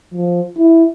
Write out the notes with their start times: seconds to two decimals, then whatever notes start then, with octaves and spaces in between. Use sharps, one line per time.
0.14 F3
0.58 E4